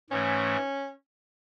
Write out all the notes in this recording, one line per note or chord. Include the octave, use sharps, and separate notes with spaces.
G#2 E3 A3 C#4